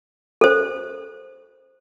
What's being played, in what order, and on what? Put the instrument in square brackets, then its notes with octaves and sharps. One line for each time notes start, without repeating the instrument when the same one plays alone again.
[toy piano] A4 C5